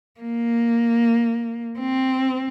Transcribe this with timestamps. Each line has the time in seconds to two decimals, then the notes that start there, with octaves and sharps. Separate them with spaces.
0.20 A#3
1.79 C4